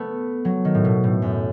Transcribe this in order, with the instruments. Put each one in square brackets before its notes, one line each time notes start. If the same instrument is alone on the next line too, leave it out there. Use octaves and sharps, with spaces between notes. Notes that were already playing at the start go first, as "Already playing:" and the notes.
Already playing: [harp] A3 B3
F#3
D#3
A2
B2
A2
F#2